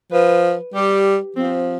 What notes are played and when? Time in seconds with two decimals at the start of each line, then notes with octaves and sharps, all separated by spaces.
0.12 F3 B4
0.74 G3 G4
1.36 F3 C4